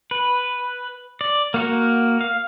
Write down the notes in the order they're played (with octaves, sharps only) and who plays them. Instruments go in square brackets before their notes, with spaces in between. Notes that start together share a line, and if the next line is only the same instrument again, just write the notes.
[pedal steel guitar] B4
D5
A#3 F#4 A#4
F5